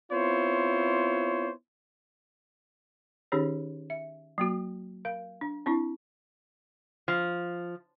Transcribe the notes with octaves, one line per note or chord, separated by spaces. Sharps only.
B3 C4 E4 F4 C5 C#5
D#3 C#4 D#4 G4 G#4 C#5
E5
F#3 A#3 F#4
A#4 F5
D4
C4 D4 E4
F3